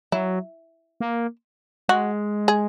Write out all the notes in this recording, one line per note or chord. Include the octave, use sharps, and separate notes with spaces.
F#3 E4
A#3
G#3 F#4
G#4